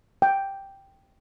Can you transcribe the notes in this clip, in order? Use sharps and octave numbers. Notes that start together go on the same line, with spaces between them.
G5